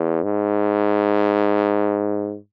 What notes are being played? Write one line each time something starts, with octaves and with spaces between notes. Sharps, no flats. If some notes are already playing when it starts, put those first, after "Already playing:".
Already playing: E2
G#2